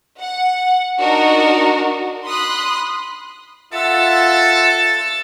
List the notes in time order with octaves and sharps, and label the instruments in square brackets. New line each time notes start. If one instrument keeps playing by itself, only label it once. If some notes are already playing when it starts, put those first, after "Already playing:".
[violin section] F#5
D4 D#4 F#4 A#4
B5 C6 D#6 F#6
[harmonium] F4 E5 F#5 [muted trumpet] A4 [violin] E6 A6